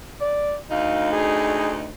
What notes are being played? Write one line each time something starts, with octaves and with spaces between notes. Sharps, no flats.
D5
D2 D#4 F5
G#4